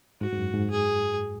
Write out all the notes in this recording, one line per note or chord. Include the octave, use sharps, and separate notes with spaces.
G#2 F#4
G#2
F#2
G#2
G#4